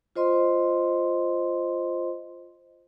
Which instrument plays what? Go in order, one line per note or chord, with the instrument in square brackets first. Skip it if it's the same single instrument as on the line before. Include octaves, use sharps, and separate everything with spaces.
[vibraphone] F4 C5 D#5 C6